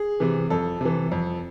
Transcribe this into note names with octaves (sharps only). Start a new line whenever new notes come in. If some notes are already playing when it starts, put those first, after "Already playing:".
Already playing: G#4
C3 E3
F2 A4
C3 E3
F2